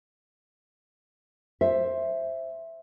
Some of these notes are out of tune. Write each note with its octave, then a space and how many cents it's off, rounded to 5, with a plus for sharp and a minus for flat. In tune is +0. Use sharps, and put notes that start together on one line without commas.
C5 +10 E5 +0